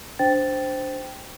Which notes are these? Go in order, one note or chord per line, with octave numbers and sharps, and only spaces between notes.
D4 C5 G5 A6